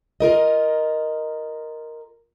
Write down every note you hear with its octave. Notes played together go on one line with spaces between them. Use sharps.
F4 A#4 D#5